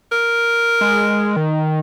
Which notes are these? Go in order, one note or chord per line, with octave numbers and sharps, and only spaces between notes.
A#4
G#3
D#3